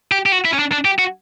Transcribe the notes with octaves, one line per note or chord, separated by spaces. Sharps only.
G4
G4
F#4
E4
C#4
D4
D4
G4
F#4